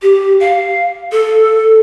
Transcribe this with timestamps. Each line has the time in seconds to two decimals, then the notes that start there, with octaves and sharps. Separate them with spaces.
0.02 G4
0.40 F5
1.12 A4